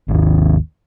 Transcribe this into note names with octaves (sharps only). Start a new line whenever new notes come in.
G#1 D#2